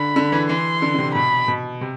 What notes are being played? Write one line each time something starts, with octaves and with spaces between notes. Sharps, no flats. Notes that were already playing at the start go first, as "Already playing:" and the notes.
Already playing: D3 B5
D3
E3
E3 C6
D3
D3
C3
B2 B5
B2
C3